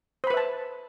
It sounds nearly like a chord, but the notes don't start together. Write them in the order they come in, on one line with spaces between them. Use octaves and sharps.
C5 B5 B4 E5 A5